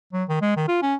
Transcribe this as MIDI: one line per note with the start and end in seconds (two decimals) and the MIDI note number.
0.13 0.24 54
0.29 0.37 51
0.42 0.52 56
0.56 0.64 51
0.69 0.78 65
0.82 0.95 61